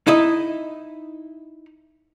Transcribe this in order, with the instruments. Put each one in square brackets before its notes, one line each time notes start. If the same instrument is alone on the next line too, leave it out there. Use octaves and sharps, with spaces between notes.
[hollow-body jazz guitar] D#4 E4 D#5